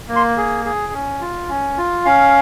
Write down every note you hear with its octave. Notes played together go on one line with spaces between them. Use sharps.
A#3
C6
G#4
G#4
C#4
F4
C#4
F4
C#4 F5